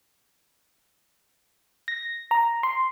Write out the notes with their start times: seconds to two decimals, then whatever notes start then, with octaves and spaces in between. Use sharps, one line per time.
1.88 A#6
2.31 A#5
2.63 C6